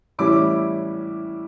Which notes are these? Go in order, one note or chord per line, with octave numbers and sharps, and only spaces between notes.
A2 E3 G3 C#4 E4 D6